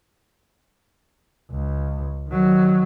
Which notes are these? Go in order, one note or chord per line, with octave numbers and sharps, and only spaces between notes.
C#2
D#3 F#3